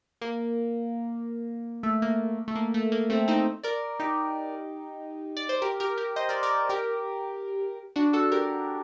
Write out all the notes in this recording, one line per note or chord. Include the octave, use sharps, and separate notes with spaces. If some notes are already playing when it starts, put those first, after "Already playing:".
A#3
A3
A#3
A3
A#3
A3
A#3
A3 C4
C4 D#4
A#4 D5
D#4 G4
D5
C5
G4 A#4
G4 A#4
G4 A#4
C5 D#5
A#4 D5
A#4 D5
G4 A#4
D4 F#4
F#4 A4
G4 A#4